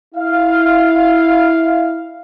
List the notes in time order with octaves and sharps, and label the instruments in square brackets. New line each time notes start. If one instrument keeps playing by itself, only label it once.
[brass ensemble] E4 F5